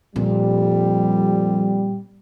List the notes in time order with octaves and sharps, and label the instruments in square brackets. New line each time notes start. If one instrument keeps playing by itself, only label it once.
[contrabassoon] F2 [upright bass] A#2 [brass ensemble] G3